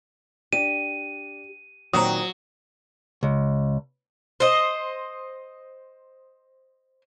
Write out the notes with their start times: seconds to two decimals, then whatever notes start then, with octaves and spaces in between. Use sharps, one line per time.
0.53 D4 G4 D#7
1.93 A#2 D#3 F#3 C4 A#5 D#6
3.23 C#2
4.40 C5 D#5